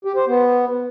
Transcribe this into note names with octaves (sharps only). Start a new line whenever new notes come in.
G4
C5
B3